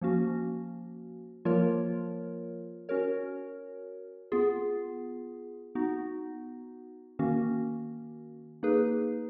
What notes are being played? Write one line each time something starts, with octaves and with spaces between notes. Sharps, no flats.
F3 A#3 C#4 F#4
F3 A#3 F4 A#4 C#5
C#4 F#4 A#4 C#5
B3 F4 G#4
B3 D#4 F#4
D#3 A#3 C#4 F#4
A#3 D#4 G#4 B4